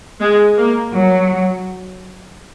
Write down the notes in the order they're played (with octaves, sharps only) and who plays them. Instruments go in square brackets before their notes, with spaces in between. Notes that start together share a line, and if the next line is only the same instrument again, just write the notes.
[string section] G#3
A#3
F#3